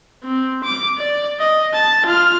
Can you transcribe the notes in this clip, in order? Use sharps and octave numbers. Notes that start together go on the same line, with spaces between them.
C4
D6
D5
D#5
A5
F4 F6